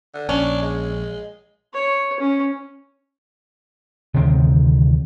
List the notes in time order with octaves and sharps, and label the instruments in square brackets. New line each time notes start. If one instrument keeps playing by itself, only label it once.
[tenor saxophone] D3
[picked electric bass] A#1 [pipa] C#4 [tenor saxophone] D4
[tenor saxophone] G#3
[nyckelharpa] C#5
C#4
[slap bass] D2 C3 D#3 C4